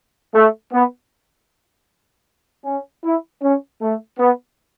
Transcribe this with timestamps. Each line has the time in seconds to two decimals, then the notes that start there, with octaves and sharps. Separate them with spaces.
0.34 A3
0.72 B3
2.65 C#4
3.04 E4
3.42 C#4
3.81 A3
4.18 B3